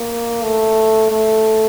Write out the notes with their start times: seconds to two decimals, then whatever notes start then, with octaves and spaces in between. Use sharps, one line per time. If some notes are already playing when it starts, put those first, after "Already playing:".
Already playing: A#3
0.43 A3
1.11 A3